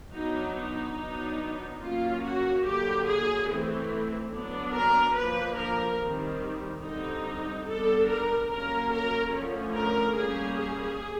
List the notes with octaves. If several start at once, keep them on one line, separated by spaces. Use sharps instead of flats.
F#3 B3 D4 D#4
D#4
F#3 B3 D4
F#3 A#3 C#4 F4
F#4
D3 F#3 A#3 G4
G#4
E3 A3 C4
F#3 B3 D4
A#4
F3 A#3 D4 B4
A#4
D#3 G3 C4
D3 G3 C4 D#4
G3 B3 D4 A4
A#4
F#3 A#3 C#4 A#4
A#4
D3 F3 A3 C#4
A#4
G3 A#3 C#4 G#4
G#4